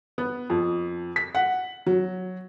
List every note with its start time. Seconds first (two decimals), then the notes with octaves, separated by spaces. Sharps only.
0.18 B3
0.50 F2
1.16 B6
1.35 F#5
1.86 F#3